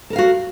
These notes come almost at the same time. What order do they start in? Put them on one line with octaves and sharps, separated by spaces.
A4 A#4 F5 F#4